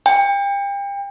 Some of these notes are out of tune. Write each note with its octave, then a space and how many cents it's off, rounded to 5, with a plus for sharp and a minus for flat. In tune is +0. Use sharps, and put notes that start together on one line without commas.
G5 +35